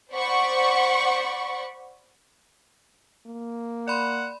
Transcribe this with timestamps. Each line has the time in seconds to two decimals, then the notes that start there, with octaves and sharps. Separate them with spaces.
0.12 C5 D5 F#5 B5 C#6
3.27 A#3
3.88 D5 F#5 B5 C6